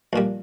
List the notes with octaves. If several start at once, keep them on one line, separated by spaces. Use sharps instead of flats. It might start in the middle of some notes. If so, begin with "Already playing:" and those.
A#1 A#2 G3